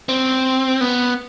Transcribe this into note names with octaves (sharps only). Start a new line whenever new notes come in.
C4
B3